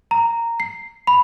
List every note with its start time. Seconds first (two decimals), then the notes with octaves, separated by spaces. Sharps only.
0.11 A#5
0.60 C7
1.07 B5